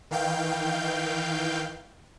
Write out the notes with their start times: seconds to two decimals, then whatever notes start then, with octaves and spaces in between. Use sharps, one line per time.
0.11 D#3 E3 F5 G5 G6